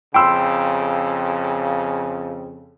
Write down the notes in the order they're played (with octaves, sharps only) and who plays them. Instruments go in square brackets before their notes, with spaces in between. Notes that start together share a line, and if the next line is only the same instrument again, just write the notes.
[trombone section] F2 C#3 [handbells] G5 [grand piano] B5 C6 E6